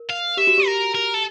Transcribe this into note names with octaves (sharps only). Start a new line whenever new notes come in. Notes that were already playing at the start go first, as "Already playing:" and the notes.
Already playing: A#4
F5
G4 E5
F#4
G4
A#4
A#4
A4